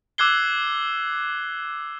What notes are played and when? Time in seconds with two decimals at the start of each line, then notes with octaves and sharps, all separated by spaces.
0.18 D6 E6 F#6 G#6 C7 G7